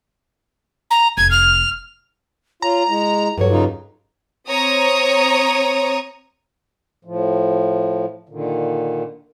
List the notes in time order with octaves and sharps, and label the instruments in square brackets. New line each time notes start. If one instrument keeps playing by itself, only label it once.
[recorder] A#5
[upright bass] F1 [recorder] G#6
[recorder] F6
[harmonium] F4 [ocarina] C#5 [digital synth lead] A#5
[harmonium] G#3 [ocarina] E4
[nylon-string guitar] G2 F#3 C#5 [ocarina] A4
[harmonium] C#3 D#4 F4
[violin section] C4 C#5 A#5 D#6
[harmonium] A2 F3
A#2 D3 D#3